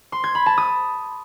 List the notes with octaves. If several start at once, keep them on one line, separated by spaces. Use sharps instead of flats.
C6
G#6
B5
A5
D#6